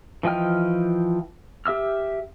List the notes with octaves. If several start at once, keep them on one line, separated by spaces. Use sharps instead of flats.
E3 F3 D#5 G5 F6
G4 E5 E6 F6